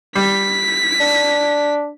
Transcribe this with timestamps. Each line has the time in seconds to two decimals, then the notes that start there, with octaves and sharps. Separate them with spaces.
0.16 G3 B6
1.00 D4